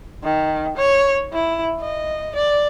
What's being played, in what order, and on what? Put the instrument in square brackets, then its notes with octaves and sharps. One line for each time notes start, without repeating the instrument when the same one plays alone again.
[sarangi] D#3
C#5
E4
D#5
D5